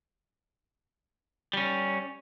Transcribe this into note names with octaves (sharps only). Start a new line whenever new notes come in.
G3 C#4